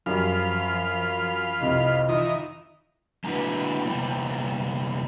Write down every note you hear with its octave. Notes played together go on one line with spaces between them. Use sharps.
F#2 F3 G3 F4 F5 B5
C2 F2 C3 D#5
D#3 E3 D#4 F4
G#3 A#3 D4 E4 F#4 B4
C3 G3 A#3 B3